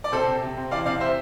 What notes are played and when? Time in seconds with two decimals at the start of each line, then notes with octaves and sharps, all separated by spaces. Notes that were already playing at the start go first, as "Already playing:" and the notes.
0.04 D5
0.12 C3 A4 C5
0.28 C3
0.42 C3
0.57 C4
0.71 E3 D5 F5
0.86 C3 D5 F5
1.00 C5 E5